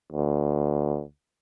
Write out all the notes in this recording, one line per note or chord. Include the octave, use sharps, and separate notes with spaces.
D2